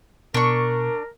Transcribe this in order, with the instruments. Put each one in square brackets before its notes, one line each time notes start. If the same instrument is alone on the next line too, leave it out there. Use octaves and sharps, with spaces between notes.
[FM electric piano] B2 [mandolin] D4 C#6 [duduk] A#4